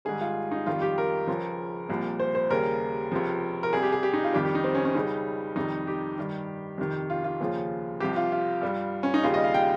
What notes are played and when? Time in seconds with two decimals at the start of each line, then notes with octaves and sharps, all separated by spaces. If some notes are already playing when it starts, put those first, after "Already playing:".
0.05 G#2 D#3 G3 G#4
0.21 F4
0.51 D#4
0.66 F2 D#3 G3 F4
0.82 G4
0.98 A#4
1.27 C#2 C#3 F3
1.89 C2 A#2 F3
2.19 C5
2.35 C5
2.50 D#2 C#3 G3 A#4
3.12 C#2 C3 F3
3.63 A#4
3.73 C2 C3 G3 G#4
3.82 G4
3.93 G#4
4.03 G4
4.13 D#4
4.24 F4
4.33 F2 D#3 G3 G4
4.45 G4
4.55 D#4
4.64 C4
4.75 C#4
4.85 C#4
4.95 C#2 C#3 G3 D#4
5.56 F2 C3 D#3 G3 D#4
5.87 G4
6.18 G2 D#3 G3
6.78 F2 C3 D#3
7.10 F4
7.24 F4
7.40 D#2 C#3 F3
8.00 C2 C3 F3 G4
8.16 F4
8.32 F4
8.62 G2 G3
9.03 C#4
9.14 D#4
9.23 D#2 C#3 G3 F4
9.34 D#5
9.44 F5
9.54 G5